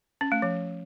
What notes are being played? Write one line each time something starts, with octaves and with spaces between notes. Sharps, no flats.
C#4
A3
F3